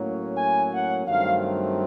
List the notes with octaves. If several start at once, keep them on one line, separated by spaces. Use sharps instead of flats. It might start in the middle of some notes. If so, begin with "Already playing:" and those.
Already playing: A2 F#3 A#3 C#4
G#5
F#5
G2 D#3 F#3 A3 C4 F5